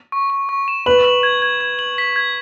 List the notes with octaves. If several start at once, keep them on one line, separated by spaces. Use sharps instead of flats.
C#6
C#6
C#6
E7
B4 F#7
F#7
G#6
G#6
G#6
F#7
B6
G#6